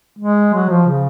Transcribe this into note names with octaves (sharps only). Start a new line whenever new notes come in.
G#3
F#3
F3
C#3